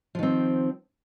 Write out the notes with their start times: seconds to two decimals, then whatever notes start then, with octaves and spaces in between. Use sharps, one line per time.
0.15 F3
0.19 D#3
0.23 C4